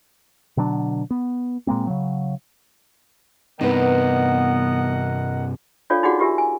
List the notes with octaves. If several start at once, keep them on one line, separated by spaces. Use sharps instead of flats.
B2 D3 F#3 D4
B3
A#2 G#3 A#3 C4
C#3 F#3
G2 C3 B3 D#4 A#4 B4 D#5 F#5
D4 F4 A4 C#5 D5 F5
D#4 F4 F#4 G#4 D5 F#5
F4 G4 A#4 E5 G#5
G#5